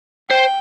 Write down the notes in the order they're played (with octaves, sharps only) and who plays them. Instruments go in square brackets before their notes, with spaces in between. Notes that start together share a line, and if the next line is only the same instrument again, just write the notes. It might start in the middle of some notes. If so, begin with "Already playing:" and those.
[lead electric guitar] C5 [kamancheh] G5